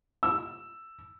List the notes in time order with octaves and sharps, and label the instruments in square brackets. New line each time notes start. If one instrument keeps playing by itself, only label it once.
[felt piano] E6